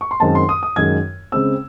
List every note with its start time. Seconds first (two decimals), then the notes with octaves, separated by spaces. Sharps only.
0.01 C#6
0.11 C6
0.20 F#2 D#3 G#3 C4 A5
0.35 C6
0.49 D#6
0.63 D#6
0.76 F#2 D#3 G#3 G#6
1.32 C#3 G#3 C4 E6